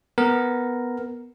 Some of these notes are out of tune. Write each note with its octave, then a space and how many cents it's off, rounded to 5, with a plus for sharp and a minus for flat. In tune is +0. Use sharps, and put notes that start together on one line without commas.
B3 +0 A#4 +0